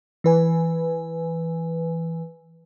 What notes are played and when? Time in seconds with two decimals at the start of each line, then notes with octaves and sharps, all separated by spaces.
0.24 E3 B4 G#5